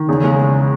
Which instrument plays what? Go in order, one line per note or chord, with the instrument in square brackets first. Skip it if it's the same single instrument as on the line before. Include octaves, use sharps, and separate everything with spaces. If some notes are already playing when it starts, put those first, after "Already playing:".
Already playing: [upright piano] D#3
[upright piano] E2 [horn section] C#3
[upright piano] G#3